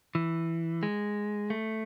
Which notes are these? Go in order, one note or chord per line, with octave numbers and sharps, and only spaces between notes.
E3
G#3
A3